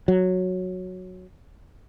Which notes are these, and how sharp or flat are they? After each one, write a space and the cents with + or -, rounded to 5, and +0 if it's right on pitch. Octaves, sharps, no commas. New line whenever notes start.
F#3 -10